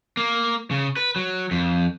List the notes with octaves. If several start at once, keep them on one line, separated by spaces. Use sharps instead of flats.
A#3
C#3
B4
F#3
F2